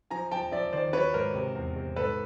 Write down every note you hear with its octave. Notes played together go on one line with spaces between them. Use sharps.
F3 G#5 A#5
F3 G5 A5
F3 D5 E5
D#3 C5 D5
F#3 B4 C#5
G#2 A#4 C5
C3
E2
C3
G#2 A4 B4